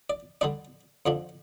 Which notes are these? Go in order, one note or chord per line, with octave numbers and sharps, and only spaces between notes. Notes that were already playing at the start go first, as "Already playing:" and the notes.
D5
D3 G3 D4 D5
F2 D3 F3 D4